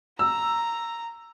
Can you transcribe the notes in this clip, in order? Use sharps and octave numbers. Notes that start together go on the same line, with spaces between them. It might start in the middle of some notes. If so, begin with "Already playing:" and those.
A#5 E6